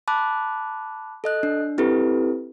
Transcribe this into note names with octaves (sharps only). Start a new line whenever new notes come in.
A5 B5 D6 F#6
A4 D#5 F#6
D4
C4 E4 G4 A4 B4